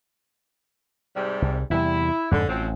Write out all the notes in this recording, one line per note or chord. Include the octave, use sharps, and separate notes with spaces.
G#2 C3 G3
C2
E2 C3 G3 E4
F2 G#2 D3
A1 F3 F#3 C4